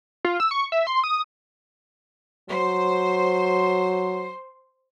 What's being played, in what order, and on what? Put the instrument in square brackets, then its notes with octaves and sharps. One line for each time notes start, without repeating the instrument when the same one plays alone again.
[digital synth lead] F4
E6
C#6
E5
C6
D#6
[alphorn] F#3 [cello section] C5